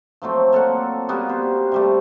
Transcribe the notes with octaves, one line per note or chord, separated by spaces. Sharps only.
F3 F#3 A3 C4
A#3 A4 D5 F#5
G3 A#3 B3 F#4
C5
C3 G3 A3